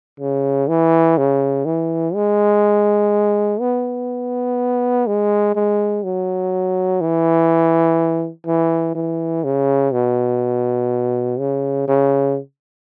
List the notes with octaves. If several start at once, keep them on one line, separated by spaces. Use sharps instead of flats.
C#3
E3
C#3
E3
G#3
B3
G#3
G#3
F#3
E3
E3
E3
C#3
B2
C#3
C#3